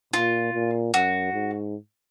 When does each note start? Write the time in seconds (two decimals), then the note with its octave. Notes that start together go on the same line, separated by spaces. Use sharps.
0.13 A#2 F4
0.53 A#2
0.94 F#2 F#4
1.33 G#2